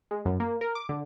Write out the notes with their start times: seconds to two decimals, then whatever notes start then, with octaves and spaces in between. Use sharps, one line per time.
0.11 G#3
0.25 F#2
0.40 A#3
0.61 A#4
0.75 D6
0.89 D3